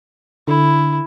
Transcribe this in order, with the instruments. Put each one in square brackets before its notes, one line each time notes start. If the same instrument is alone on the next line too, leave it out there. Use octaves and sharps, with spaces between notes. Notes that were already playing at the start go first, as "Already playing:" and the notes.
[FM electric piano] D3 [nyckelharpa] E4